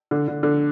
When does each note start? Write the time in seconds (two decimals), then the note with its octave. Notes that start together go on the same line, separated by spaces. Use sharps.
0.11 D3
0.28 D3
0.43 D3